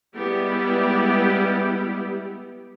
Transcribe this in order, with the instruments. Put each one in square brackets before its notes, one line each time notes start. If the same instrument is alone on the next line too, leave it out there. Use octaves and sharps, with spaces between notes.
[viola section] G3 G#3 B3 E4 G4